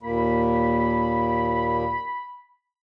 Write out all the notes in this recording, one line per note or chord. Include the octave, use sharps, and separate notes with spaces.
D#2 A#2 A#3 B5